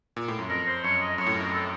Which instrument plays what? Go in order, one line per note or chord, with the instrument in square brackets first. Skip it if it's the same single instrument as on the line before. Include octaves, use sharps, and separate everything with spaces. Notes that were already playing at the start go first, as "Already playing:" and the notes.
[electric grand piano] A#2
A2
F#2
[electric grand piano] F2 [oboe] A#4
[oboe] C5
[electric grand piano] F#2 [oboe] C#5
[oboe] D#5
[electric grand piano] F#2 [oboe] C#5
[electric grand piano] A2
[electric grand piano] F#2 [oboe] A#4
[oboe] A4